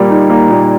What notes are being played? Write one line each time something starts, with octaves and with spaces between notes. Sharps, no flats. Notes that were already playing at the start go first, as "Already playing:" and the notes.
Already playing: A#2 G3 A#3
D#4
A#3
A#2